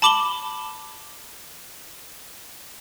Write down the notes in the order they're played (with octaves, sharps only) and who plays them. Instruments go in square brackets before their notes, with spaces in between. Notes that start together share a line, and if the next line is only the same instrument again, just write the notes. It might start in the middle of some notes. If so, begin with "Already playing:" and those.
[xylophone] A5 B5 D6 E7 F#7 G7